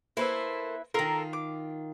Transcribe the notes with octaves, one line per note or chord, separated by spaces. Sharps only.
A#3 E4 A4 B4 C5 E5
D#3 F4 A4 A#4 C6
D6